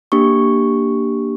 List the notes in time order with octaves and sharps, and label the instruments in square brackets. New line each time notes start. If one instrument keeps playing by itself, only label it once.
[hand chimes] A#3 D4 G4 C#6